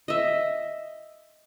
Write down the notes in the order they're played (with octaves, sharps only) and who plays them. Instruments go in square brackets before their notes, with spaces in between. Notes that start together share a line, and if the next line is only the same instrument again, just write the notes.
[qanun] D#5 E5